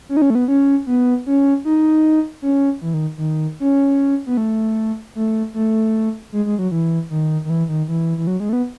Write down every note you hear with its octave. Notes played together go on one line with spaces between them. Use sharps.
C#4
D#4
C#4
A3
B3
C#4
B3
C#4
D#4
C#4
E3
D#3
D#3
C#4
B3
A3
A3
A3
G#3
G#3
F#3
E3
D#3
D#3
E3
D#3
E3
E3
F#3
G#3
A3
B3